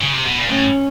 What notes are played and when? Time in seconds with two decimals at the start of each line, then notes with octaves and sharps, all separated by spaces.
0.00 C#3
0.13 C3
0.25 B2
0.38 A#2
0.49 A2 C#4